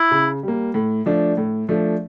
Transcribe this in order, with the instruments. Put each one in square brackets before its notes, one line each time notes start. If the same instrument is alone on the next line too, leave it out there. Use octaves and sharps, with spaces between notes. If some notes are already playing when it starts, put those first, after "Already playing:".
Already playing: [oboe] E4
[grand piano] C#3
G3 A#3
A2
F3 A3 D4
A2
F3 A3 D4